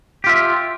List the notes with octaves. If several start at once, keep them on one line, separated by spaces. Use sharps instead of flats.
F4 G4 E5